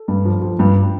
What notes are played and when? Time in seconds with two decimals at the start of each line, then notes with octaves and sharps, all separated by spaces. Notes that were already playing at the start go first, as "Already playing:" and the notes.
Already playing: A4
0.08 G2
0.25 F3
0.42 F3
0.59 G2